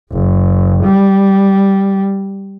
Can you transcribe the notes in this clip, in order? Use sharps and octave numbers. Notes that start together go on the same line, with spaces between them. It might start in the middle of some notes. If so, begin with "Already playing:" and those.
F#1
G3